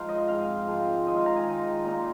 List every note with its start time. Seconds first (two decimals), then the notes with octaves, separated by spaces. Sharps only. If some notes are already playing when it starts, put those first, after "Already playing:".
Already playing: F3 G#3 D#4 F5
0.09 D#5
0.28 G#2 F3 C4 F5
0.68 G#2 F3 C4
1.07 D#3 G#3 F4 D#5
1.17 F5
1.26 A#5
1.36 G#5
1.46 D#3 G#3 F4
1.84 A#2 A#3 D#4 A#5